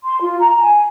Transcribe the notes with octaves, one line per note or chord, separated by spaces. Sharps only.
C6
F4
A#5
G#5